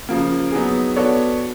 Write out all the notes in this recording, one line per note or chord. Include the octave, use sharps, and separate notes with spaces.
C#3 F3 A#3
F#3 B3 D#4 G#4
B3 D4 F#4 A4 C#5